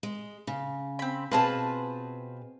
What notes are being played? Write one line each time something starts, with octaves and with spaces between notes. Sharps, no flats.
G#3
C#3
C4 B5
B2 C4 F4 G#4 B4 A5